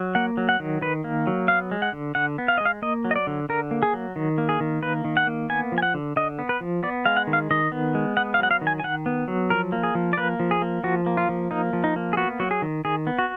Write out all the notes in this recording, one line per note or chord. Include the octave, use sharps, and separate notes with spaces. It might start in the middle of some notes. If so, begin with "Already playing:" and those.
Already playing: F#3
A#3 F#5
F#3
F#5
D#3
D#3 B4
A#3
F#3
B3 F5
G#3
F#5
D3
D3 F#5
B3
F5
G#3 D#5
F5
A#3 D#5
F#3
D#5
D5
D3
D3 A#4
A#3
G#4
F#3
D#3
A#3
G#4
D#3
A#3 B4
D#3
F#5
A#3
B3 G#5
F3
G#5
F#5
D3
D3 D#5
B3
B4
F3
B3 D5
G#3 F5
F#5
D#3
F5
D#3 D#5
B3
G#3
B3 F#5
F5
F#3 F#5
F5
D#3
G#5
G#5
D#3 F#5
B3
F#3
F3 A#4
A#3
G#4
F3
D5
A#3 B4
F3
G#4
A#3
F3 F#4
A#3
F4
F3
A#3 D#4
F3
D#4
A#3
G#4
B3 F#4
F#3 F#4
G#4
D#3
D#3 G#4
B3
F#4